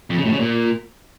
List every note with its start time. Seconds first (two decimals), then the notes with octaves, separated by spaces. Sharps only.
0.10 F2
0.17 C#3
0.25 A2
0.32 C#3
0.39 A#2